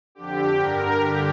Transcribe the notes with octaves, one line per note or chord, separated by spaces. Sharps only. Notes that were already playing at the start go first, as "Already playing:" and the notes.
F2 D3 G4
G2 D3 A#4
G2 D3 G4